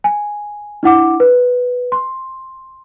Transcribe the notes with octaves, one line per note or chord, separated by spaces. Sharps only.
G#5
D4 E4 F#5 D6
B4
C6